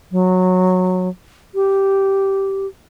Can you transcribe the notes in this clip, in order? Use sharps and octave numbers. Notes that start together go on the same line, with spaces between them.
F#3
G4